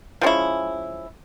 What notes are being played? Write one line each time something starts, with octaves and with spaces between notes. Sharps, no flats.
F3 G#3 C#4 E4